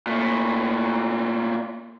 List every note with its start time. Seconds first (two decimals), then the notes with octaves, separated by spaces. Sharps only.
0.07 A#2 A3